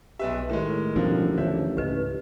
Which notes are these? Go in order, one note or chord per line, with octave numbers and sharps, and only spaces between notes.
B1 G4 B4 E5
A2 D#3 G#3
A1 B2 D3 F3 G3 A#3
D#2 D3 F3 C#5 E5
C#2 G#2 G4 B4 D#5